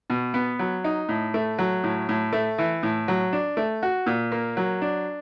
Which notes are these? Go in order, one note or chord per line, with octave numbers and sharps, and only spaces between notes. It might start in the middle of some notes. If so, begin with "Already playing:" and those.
B2
B3
F#3
D#4
A2
A3
F#3
A2
A2
A3
E3
A2
F#3
D4
A3
F#4
A#2
A#3
F#3
D4